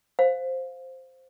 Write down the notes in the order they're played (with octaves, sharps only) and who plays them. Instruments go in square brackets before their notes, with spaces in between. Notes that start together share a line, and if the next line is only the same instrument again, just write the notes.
[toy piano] C5 F5